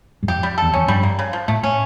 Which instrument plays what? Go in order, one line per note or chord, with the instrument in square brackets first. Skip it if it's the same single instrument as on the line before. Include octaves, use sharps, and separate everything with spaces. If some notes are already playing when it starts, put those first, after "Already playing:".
[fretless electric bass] G2
[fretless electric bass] F2 [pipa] G4
[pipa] G3
[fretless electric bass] E2 [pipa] A4
[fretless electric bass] F2 [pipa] C#4
[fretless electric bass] G2 [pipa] G3
[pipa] A#3
C#3
F3
[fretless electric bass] A2 [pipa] A3
[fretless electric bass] A2 [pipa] C#4